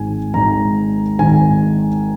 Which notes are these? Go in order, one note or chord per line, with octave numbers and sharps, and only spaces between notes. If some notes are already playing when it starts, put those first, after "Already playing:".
Already playing: G#1 G#2 D#3 G#5
G#1 G#2 D#3 A#5
G#1 G#2 D#3 G#5